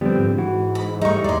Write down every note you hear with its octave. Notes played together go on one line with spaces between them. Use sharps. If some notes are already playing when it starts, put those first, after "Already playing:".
D3 F3 G3 B3 C4
G#2
E3 F#4
B5
G3 A3 D#4 C#6
D#2 G#3 D5 C6